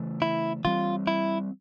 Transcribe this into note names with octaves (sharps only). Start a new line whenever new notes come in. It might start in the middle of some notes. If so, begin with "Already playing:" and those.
Already playing: C#3 E3 A3
E4
E3 G3 C4 F4
E4